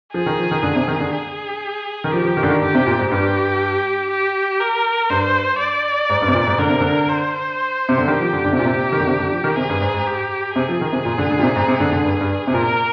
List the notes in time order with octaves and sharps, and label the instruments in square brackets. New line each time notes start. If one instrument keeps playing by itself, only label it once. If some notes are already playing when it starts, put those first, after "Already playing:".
[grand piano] F3 [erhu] G#4
[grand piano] D#3
F3
D#3
D3
C3
D#3
D3
[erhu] G#4
[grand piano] D#3
[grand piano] F3 [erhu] G4
[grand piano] F3
D#3
D3
D#3
[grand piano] D3 [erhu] G4
[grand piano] C3
A#2
G#2
[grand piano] G2 [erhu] G4
[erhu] G4
A#4
[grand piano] G2 [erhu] C5
[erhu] D5
[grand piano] G#2
G2
C3
A#2
G#2
[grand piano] D3 [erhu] A#4
[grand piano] C3
D3
[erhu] C5
[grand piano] C3
D3
[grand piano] D#3 [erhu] G4
[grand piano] F3
D3
D3
C3
[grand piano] A#2 [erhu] G4
[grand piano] C3
D#3
D3
C3
D3
F3
D#3
[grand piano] C3 [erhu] G#4
[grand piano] G2
G#2
G#2
[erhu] G4
[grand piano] C3 [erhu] G#4
[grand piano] F3
D#3
C3
A#2
D3
D3
A#2
C3
G#2
C3
D3
D3
G2
G2
C3
[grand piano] A#2 [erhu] A#4